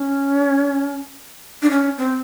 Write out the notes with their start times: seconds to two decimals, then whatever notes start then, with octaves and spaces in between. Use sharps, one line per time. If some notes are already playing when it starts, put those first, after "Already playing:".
Already playing: C#4
1.62 D4
1.70 C#4
1.98 C4